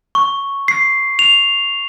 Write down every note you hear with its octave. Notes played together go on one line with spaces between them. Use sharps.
C#6
C7
F7